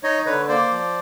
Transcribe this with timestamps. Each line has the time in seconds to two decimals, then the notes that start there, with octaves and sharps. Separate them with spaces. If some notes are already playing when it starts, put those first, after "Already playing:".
0.03 D#4 C#5 D#5
0.26 D3 B4 C#5
0.48 A#3 C5 D5
0.70 F3